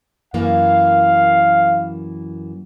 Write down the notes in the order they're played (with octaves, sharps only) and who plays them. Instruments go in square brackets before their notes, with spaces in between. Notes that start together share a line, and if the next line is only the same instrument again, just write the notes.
[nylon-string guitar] F#2 E3 A#3 [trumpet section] F5